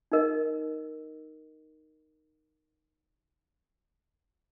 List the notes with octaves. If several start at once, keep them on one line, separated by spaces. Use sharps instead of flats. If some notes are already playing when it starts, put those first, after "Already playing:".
D#4 A#4 D#5